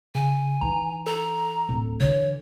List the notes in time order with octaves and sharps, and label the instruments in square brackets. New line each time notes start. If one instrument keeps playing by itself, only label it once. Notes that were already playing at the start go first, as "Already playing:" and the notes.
[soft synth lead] C#3 [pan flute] G#5
[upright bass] E3 D#4 [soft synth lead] A#5
[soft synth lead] A4 [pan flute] A#5
[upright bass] D1
[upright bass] D3 E3 [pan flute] C#5